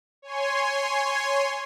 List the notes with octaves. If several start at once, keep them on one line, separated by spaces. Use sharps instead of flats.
C#5 G#5 C6